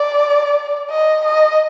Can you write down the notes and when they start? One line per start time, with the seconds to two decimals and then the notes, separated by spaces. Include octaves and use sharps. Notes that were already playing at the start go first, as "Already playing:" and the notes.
Already playing: D5
0.90 D#5
1.25 D#5